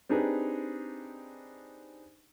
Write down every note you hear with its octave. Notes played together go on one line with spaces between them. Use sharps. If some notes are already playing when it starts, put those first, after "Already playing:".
C4 D4 D#4 G4 G#4 B4